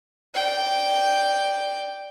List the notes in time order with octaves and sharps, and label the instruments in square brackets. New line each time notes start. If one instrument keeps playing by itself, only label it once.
[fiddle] D5 G5